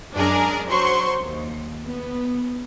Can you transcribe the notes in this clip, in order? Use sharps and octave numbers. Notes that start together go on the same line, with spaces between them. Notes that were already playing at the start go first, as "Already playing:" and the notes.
F#2 G#3 D4 G#4 A#4 D5
F#3 C5 C6 C#6
D#2
B3